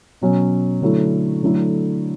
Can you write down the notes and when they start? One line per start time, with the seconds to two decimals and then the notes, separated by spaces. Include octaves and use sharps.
0.21 B2 F#3 C#4
0.82 D3 F#3 A3 E4
1.43 D3 F#3 A3 E4